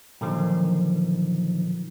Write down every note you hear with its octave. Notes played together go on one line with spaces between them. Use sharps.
A#2 D3 D#3 F3 F#3 D#4